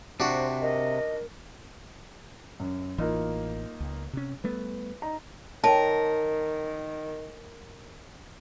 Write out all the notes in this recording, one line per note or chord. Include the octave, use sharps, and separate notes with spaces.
C3 D4 F#4 C5
A#4 D#5
F#2
A1 E3 A#3 D#4 F4
C#2
C3 C#4
G3 A3 B3 B4
D#4 A#5
D#3 A#4 C#5 G5 A5